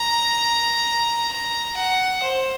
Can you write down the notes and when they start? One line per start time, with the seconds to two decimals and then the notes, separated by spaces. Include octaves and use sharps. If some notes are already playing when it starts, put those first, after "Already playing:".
Already playing: A#5
1.32 A#5
1.77 F#5
2.22 C5